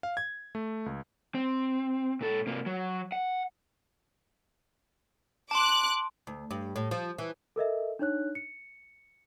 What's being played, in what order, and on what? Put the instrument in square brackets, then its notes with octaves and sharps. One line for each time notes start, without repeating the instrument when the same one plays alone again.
[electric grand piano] F5
G#6
A3
C#2
[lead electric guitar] C4
A#2 A4
C3 A#3
F#3
F#5
[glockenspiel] A5 C6 [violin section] D6 F#6
[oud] D2
G2
A2
F3
E3
[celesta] A4 A#4 D#5 E5
D4 D#4 C#5 F#6
C#7